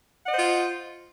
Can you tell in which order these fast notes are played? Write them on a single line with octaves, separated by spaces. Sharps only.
F#5 D#5 C5 F4